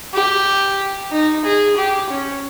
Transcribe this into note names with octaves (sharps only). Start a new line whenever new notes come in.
G4
D#4
G#4
G4
C#4